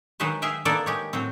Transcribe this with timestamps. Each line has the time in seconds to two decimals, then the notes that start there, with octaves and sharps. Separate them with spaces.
0.20 D#3 F#3 G#3 B4 C5
0.42 G#4 E5 F5 G5
0.65 D#3 A#3 B3 A4 D5
0.86 G#3 G4 C#5
1.13 A2 F#3 C4